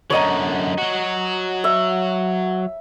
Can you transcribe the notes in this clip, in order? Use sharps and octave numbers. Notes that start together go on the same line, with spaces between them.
F#2 D3 C#5 D#5 A#5
F#3 F#4
E5